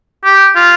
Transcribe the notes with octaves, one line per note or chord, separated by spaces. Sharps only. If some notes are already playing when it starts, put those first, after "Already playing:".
G4
F4